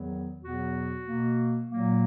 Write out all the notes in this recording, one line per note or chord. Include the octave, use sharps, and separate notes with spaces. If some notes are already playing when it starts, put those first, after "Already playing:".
Already playing: E2 D#3 F#3 B3
E2 B2 F#3 B3 F#4
B2 A#3
A#2 F#3 A#3